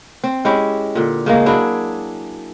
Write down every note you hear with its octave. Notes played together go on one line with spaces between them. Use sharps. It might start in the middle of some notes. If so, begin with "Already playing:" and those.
C4
G#3 C#4 E4 G4
A#2 D3
C#3 G#3 A#3
F#3 D4 E4 G#4